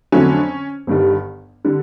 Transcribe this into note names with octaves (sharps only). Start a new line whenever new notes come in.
F2 D3 F#3 A3 C#4
G1 G2 D#3 G3
D3 G3